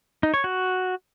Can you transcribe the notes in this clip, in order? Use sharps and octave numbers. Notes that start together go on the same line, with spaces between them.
D#4
C#5
F#4